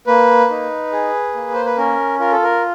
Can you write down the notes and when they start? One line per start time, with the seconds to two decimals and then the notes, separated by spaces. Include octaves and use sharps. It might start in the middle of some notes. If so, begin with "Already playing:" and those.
0.07 A#3 B4
0.50 D#4
0.92 G#4
1.34 A#3
1.54 C5
1.65 B4
1.77 C#4 A#4
2.19 F4 A#4
2.31 A4
2.43 A#4